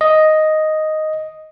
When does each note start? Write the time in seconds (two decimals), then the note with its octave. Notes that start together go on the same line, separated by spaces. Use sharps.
0.01 D#5